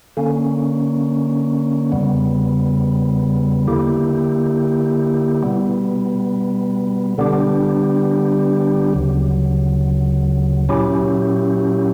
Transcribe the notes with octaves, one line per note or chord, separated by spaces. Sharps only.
D3 A#3 C#4
E2 C#3 G3 B3
D3 A#3 E4 G4
B2 G3 B3
D3 G3 B3 D4 G4
D2 C#3 F#3
A#2 F#3 C#4 E4 G4